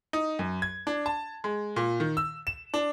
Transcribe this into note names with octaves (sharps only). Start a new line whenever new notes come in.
D#4
F#2
G#6
D4
A5
G#3
A#2
D#3
E6
E7
D4